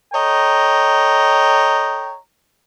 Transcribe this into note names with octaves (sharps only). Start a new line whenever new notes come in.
A4 C#5 D#5 G5 A#5